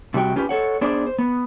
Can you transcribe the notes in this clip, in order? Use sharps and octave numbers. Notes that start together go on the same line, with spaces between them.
C3 G3 F#4 G5
C#4 F4 G4 B4
A4 C#5 F#5
B3 D4 G#4 C5 D5
C5
B3